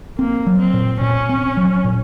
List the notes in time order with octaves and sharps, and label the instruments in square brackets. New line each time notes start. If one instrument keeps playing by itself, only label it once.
[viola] A#3 [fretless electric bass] C4
[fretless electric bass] F#3
[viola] C4
[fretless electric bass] A#2
[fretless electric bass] A#2 [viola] C#4
[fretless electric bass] C4
F#3
A#2